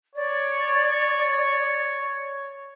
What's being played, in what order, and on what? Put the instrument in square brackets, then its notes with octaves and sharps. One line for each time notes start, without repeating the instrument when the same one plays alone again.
[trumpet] C#5 [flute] D5